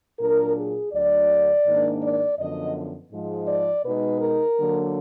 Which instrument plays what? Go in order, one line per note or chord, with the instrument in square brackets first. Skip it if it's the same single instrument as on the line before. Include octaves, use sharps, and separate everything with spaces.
[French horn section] A#2 F#3 D4 A#4
G#4
D2 D3 F#3 D5
G#2 D#3 A#3 D4
D5
F#2 D3 F3 B3 D#5
G#2 F3 G#3
D5
B2 G#3 D#4 B4
A#4
D3 F#3 A#3